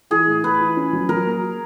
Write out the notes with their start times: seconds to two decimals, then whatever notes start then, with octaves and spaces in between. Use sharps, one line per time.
0.10 E3 G#4
0.27 A2
0.44 A2 B4
0.60 E3
0.77 C#4
0.93 F#3
1.09 F#3 A#4
1.25 A#3